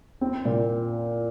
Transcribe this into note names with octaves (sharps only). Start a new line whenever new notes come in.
C4
A#2